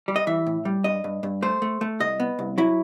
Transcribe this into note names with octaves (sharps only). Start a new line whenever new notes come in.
G3
D#5
E3 E5
A2
G3
G2 D#5
G2
G2
A3 C5
A3
A3
C2 D#5
B3
C2
F#3 E4